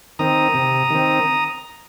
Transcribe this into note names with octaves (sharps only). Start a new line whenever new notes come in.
D#3 C4 A#5 D#6
C3
D#3 C4